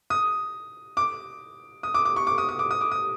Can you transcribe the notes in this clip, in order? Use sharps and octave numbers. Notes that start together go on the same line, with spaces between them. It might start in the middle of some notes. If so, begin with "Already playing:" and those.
D#6
D6
D#6
D6
D6
C#6
D6
D#6
D#6
D6
D#6
D6
D#6